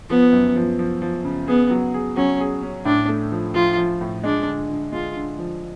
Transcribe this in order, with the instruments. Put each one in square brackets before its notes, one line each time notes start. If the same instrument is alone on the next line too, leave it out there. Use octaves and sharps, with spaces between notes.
[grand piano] F3 [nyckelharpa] B3
[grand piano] F#2
F3
F3
F3
C#3
[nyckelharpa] B3 [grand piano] G#4
[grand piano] F#3
G#4
[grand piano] F#3 [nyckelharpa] C#4
[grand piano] G#4
C#4
[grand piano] A2 [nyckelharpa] D4
[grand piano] A3
F3
[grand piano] F3 [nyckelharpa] F4
[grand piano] F3
A2
[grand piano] G#3 [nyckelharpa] D4
[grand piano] D3
D3
[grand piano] G#3 [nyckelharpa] F4
[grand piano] D3
F3